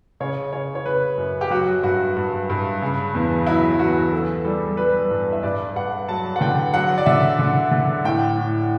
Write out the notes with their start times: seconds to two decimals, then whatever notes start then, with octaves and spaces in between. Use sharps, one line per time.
0.20 C#3 C#5
0.53 C#3 C#5
0.75 C#5
0.86 C#3 B4
1.18 F#2
1.41 G4
1.50 F#3 F#4
1.83 G2 F#4
2.16 G2
2.50 G2
2.82 C#3
3.15 E2
3.47 F#3 E4
3.79 E2 F#4
4.12 E3 A4
4.45 G3 A4
4.77 G3 B4
5.10 G2
5.32 E5
5.43 G2 D5
5.76 G2 F#5
6.09 F#3 A5
6.36 F#5
6.41 D3 G5
6.74 F#3 F#5
6.98 D5
7.06 D3 E5
7.39 D3
7.71 D3
8.04 A2 G5
8.37 A2